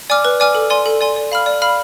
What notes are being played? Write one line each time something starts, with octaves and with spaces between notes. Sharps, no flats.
D5 G#5 D6 F6
B4
D5 G#5 D6 F6
A4
D5 G#5 C6
A4
D5 G#5 C6
D5
F5 B5 F6
D5
F5 B5 F6